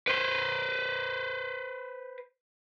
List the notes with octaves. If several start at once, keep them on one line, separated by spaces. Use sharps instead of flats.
B4 C5